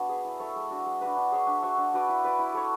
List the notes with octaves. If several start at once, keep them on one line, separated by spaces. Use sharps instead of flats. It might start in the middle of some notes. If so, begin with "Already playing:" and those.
Already playing: B3 D4 F#4
G#4 B4
E4
A4 C#5 E5
G#3
D4 F#4
G#3
D4 F#4 B4
D4
G#4 C#5 E5
D4
F#4 C#5 E5
D4
F#4 B4 D5
E4
B4 D5
E4
A4 C#5